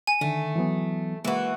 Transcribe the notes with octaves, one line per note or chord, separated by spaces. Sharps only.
G#5
D3 D#3 A3
E3 F#3 B3
E3 G#3 A#3 F#4 B4